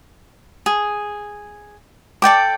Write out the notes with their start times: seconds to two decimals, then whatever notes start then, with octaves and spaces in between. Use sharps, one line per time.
0.66 G#4
2.22 A4 D5 G5 D6